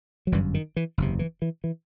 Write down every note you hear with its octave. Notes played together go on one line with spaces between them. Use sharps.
F#3
G1 F#2 E3 G3
D#3
E3
F#1 E2 C3
E3
E3
E3